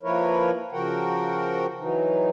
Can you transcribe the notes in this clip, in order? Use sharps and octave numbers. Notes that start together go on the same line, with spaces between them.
F3 A#3 E4 A#4 B4 C#5
C#3 F3 F#4 A#4 F#5 G5
E3 F#3 D#4